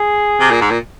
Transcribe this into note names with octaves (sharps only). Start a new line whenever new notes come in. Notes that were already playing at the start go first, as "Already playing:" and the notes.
Already playing: G#4
C3
A#2
G#2
A#2